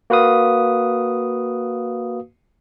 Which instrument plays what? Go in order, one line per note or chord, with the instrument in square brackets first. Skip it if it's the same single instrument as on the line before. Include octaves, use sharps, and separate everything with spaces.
[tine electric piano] A#3 F#4 B4 F5 D#6